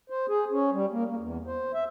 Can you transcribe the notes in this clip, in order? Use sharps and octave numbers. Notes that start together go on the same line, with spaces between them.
C5
G#4
C#4
G3
A#3
A#3
E2
C5
E5